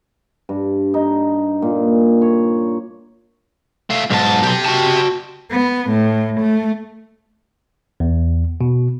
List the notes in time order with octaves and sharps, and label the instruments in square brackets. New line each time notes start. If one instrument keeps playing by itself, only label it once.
[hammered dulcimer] G2
D#4
A#2
C#5
[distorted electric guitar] A3 F4
[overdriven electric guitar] B1 A5 [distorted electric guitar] G#2
[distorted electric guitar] G4 C6
[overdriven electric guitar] F#4 A5
[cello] B3
A2
A3
[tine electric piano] E2
B2